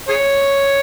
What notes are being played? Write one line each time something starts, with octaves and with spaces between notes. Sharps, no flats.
G#4 C#5